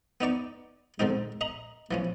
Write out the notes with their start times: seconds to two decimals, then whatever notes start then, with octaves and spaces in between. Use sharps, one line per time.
0.21 B3 D#4 D5 C#6
1.00 D3 G#3 C4 D#4
1.41 D#5 A#5 B5
1.91 E3 F3 C#4